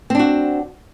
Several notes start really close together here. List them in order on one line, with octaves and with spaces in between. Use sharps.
C4 D4 F#4